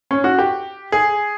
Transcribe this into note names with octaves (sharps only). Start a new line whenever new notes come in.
C#4
F#4
G4
G#4